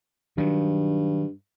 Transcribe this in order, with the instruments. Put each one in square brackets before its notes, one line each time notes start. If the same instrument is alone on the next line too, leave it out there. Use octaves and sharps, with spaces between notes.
[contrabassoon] G2 [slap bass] D#3 F#3